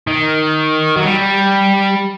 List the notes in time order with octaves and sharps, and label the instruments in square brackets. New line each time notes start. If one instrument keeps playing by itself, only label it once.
[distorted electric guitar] D#3
F#3
G3